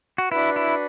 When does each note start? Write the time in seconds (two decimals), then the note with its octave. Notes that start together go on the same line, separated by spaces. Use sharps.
0.18 F#4
0.31 D4 E4 F#4 B4
0.56 E4